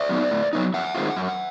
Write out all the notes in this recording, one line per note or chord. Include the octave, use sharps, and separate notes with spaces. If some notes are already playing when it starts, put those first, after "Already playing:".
Already playing: D5 E5
F#3 B3 D#4
A2
F#3 B3 D#4
F#2 E5 F#5
D#3 G#3 C4 F4
F#2